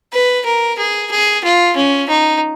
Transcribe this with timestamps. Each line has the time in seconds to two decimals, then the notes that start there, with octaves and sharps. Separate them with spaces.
0.13 B4
0.45 A#4
0.78 G#4
1.11 G#4
1.44 F4
1.76 C#4
2.09 D#4